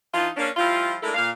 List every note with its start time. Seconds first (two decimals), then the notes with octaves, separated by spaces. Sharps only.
0.13 E3 D4 D#4 F4
0.36 A#3 C#4 D4
0.57 F3 G3 E4 F4
1.02 G#3 A3 D4 E4 A4 A#4
1.14 A#2 F5